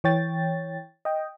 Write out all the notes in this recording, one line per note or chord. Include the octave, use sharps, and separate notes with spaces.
E3 C#5 G5 A6
D#5 G5